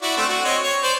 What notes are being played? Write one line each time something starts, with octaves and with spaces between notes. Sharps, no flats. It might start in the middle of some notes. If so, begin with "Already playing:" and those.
E4 F#4 D5
A3 C4 D4
F#4
C4 C#5 D#5
C#5
C5 D5